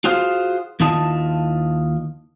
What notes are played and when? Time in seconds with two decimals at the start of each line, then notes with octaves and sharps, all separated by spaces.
0.04 F4 F#4 G#4 C5 F5
0.80 D#2 D#3 E4 F4 D#5 A5